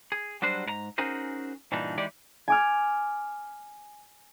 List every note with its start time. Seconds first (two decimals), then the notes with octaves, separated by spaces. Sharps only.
0.12 G#4
0.42 F#3 G3 D4 F#4 C5
0.66 G#2 A#4 A#5
0.98 C#4 D#4 F#4 G#4 A#4 C5
1.72 G2 A#2 E3 G3 D4 D#4
1.98 E3 G#3 D#4 G4 D5
2.48 G#5 D6 F6